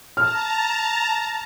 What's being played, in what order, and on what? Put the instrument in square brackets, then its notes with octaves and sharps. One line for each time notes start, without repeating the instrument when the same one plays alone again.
[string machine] A5 A#5 [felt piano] F6